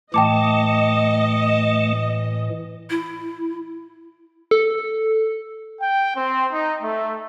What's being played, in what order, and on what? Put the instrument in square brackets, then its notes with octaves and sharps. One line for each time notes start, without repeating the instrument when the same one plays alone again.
[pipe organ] A2 E3 [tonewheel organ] A3 [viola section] D#5 [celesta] G5 A5 D6
[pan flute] E4
[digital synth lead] A4
[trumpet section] G5
C4
D#4
A3